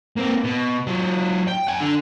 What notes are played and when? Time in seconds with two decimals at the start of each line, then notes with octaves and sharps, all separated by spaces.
0.16 A#3 C4
0.44 B2
0.87 F#3 F4
1.48 G5
1.68 F#5 G#5
1.80 D3